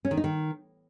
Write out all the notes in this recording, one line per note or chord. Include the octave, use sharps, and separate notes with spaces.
C#4
D#3
D#4
D#3